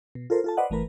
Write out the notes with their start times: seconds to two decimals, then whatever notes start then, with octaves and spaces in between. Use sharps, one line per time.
0.15 B2
0.30 F4 A4 A#4 C5
0.44 F4 A4 A5
0.57 B4 C5 D5 D#5 F#5
0.70 G1 E3 A3 A#4 B4